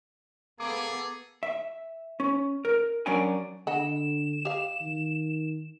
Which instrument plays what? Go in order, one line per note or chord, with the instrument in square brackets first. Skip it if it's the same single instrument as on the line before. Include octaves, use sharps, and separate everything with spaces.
[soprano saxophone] A#3 [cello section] B3 A4 [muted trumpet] G#4 [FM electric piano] D6
[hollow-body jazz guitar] E5
C#4
A#4
F#3 C#4 D4 A#4 F#5 G#5
[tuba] D3 [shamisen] D#5 F#5 B5 [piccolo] E7
[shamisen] G4 F5
[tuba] D#3